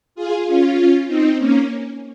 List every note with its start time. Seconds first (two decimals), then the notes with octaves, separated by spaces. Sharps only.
0.15 F4 G#4
0.46 C#4 F4
1.07 C4 D#4
1.38 A#3 C#4